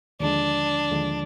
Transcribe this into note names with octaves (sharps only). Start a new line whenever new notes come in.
D#2 D3 F3 G#3 D4
D#2 D3 F3 G#3